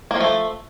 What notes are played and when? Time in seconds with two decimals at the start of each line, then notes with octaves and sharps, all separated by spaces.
0.11 A#3
0.16 F3
0.20 A3